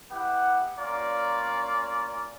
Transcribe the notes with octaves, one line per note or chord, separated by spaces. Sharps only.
B3 E4 G4 F#5
A#3 C#4 F4 D5 F5 A#5